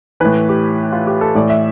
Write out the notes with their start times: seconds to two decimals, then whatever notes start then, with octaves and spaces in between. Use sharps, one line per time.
0.20 A2 E3 B4
0.49 G4
0.92 F4
1.07 G4
1.21 A4
1.35 A2 E3 D5
1.50 E5